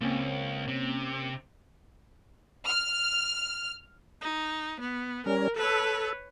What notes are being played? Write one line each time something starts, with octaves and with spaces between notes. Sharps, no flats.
C#2 A#3 C4 C#4
C3
F6
D#4
B3
G3 C#4 A#4
A4 B4 C#5